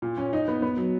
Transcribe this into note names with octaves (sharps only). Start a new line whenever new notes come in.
A#2
C#4
D#4
B3
B3
F#3